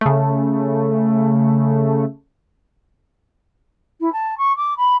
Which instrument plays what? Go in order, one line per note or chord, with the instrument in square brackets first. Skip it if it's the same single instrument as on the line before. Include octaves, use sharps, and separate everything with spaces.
[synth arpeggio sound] C#3 A3
[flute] E4
A5
C#6
D6
B5